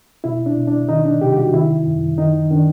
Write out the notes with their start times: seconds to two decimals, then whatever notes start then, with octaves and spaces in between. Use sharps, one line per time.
0.24 B2 E4
0.46 D4
0.57 B2
0.67 D4
0.89 D#3 D#4
1.05 D4
1.21 C3 G4
1.32 G4
1.38 F#4
1.54 D#3 E4
1.86 F#2
2.18 D#3 D#4
2.51 D#3 D4